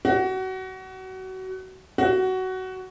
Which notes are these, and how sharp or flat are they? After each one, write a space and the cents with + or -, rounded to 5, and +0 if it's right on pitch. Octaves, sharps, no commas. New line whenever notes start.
F#4 +25
F#4 +15